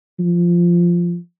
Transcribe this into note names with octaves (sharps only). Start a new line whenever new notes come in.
F3